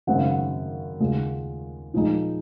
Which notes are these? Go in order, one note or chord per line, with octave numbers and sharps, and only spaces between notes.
G#1 F#2 C#3 G#3 C4 F#5
F5
F#5
D#2 C#3 G#3 C#4 F4
A#2 F3 G#3 D#4